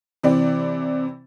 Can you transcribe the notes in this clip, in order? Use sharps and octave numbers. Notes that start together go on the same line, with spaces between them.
C3 E3 C4 D5